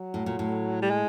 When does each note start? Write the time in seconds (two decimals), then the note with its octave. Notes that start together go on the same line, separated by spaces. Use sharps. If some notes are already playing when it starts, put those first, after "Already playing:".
Already playing: F#3
0.14 A2
0.26 A#2
0.39 A2
0.82 G3
0.91 G#3